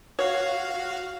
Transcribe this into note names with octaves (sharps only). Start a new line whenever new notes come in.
F#4 C#5 F5